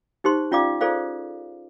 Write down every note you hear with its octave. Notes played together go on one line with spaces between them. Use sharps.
D#4 G4 C5 C6
C#4 F4 D5 F5 D6
F4 G#4 A4 C5 D5 F5